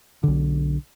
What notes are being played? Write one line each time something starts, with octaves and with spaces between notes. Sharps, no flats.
B1 D3